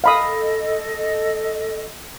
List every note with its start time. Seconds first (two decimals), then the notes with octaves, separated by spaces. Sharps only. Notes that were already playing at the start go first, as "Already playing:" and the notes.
0.04 A4 D#5 F5 B5 D#6